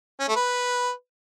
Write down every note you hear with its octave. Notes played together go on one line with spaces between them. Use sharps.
C#4
A3
B4